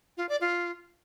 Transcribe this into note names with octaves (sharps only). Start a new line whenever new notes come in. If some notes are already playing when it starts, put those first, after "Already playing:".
F4
D5
F4